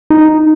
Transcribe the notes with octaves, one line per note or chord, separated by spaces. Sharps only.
D#4